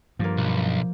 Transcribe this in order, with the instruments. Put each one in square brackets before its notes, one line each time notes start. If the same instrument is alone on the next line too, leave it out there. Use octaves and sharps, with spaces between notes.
[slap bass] G2 [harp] F3 A#3
[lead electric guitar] B1